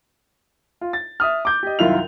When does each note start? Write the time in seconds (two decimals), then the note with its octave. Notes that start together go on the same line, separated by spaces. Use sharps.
0.81 F4
0.93 A6
1.20 E5 D#6 F6
1.45 D6 G6
1.63 G4 D#5
1.79 C2 F#2 D#3 E4 F4 F7